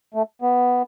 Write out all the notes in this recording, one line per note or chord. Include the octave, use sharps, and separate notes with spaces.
A3
B3